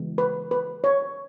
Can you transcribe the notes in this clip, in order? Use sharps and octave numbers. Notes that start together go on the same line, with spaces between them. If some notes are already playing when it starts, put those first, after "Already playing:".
Already playing: C#3 E3 G#3 B3
B4
B4
C#5